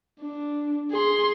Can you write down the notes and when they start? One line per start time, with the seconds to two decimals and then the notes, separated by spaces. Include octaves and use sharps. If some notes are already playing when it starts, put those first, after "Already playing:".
0.21 D4
0.91 G#4 C6